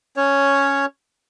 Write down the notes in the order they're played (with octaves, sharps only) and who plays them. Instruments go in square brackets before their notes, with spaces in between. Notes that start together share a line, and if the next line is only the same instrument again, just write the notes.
[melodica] C#4 C#5